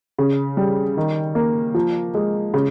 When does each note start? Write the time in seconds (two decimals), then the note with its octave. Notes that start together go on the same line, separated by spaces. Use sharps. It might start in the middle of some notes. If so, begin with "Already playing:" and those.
0.19 C#3
0.57 G3
0.97 D#3
1.35 A#3
1.75 F3
2.14 G#3
2.54 C#3